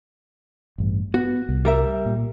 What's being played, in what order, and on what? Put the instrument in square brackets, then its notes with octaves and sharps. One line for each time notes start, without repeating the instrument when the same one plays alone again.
[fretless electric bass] A1 G2
[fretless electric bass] B3 [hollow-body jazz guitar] F#4
[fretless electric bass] C2
[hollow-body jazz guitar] G3 A#4 E5
[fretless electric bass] A#2